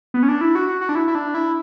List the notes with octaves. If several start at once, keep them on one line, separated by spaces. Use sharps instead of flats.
B3
C#4
D4
E4
F#4
F#4
F#4
D4
E4
E4
D4
E4